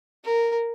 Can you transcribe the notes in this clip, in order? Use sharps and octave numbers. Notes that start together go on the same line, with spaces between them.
A#4